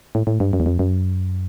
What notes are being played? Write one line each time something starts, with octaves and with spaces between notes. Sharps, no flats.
A2
A2
G2
F#2
E2
F2
F#2